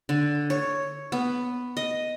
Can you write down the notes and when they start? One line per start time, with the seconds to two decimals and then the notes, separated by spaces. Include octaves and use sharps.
0.09 D3
0.50 C#5
1.12 B3
1.77 D#5